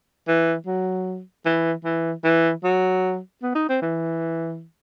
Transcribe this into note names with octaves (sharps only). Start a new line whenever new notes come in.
E3
F#3
E3
E3
E3
F#3
B3
D#4
C4
E3